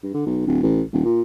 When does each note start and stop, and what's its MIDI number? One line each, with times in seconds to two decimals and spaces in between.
0.03 0.13 43
0.14 0.23 50
0.26 0.44 35
0.47 0.60 26
0.63 0.82 33
0.93 1.00 27
1.05 1.22 46